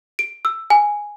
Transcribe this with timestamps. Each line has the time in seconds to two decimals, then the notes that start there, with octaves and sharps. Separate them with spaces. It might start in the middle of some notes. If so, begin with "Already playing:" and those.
0.19 D7
0.45 E6
0.70 G#5